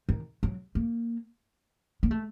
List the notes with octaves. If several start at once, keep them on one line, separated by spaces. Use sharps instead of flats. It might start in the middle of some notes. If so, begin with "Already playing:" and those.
D#3
F#3
A#3
A#3
A3